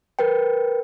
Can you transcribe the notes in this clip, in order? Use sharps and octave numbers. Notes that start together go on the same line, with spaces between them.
A#4 B4 G5